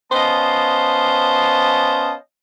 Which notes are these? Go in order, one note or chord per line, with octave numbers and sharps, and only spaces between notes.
B3 C#4 C5 D#5 F5 A5